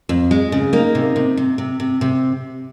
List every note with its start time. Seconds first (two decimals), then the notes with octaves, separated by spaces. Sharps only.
0.09 F2
0.31 G#3
0.52 C#3
0.73 A#3 D#4
0.95 C3
1.16 C3
1.37 C3
1.58 C3
1.80 C3
2.01 C3